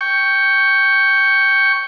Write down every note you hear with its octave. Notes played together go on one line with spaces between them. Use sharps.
G5 C#6